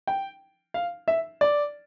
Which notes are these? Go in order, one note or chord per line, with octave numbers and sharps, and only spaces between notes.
G5
F5
E5
D5